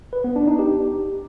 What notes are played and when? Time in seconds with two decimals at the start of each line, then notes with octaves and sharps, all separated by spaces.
0.13 B4
0.24 B3
0.36 D4
0.47 D#4
0.59 G4